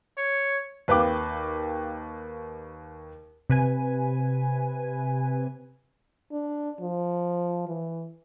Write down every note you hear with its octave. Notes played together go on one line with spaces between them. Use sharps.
C#5
D#2 B4 F5 G5 D6
C3 B4 G#5
D4
F3
E3